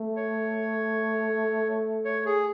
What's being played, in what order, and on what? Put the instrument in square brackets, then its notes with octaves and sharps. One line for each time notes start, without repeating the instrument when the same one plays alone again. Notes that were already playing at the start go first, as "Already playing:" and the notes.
Already playing: [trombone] A3
[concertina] C#5
C#5
G#4